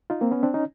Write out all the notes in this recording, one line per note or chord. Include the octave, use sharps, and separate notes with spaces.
D#4 F4
A#3 C4
B3 C#4
C4 D4
C#4 D#4